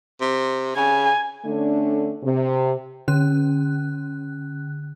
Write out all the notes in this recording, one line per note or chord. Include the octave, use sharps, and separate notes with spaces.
C3
C#3 G#5
D3 A3 C#4 D4
C3
D3 C#4 F#6